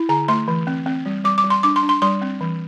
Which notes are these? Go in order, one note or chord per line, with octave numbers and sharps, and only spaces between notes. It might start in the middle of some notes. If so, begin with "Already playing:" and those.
Already playing: E4
D3 A#5
A3 C6
E3
C4
C4
G3
G3 D6
D6
G3
C6
D4 D6
C6
D4
C6
G3 C6
C4
E3